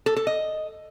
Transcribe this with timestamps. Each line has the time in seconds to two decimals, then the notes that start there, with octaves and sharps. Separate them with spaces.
0.06 A4
0.16 A4
0.27 D#5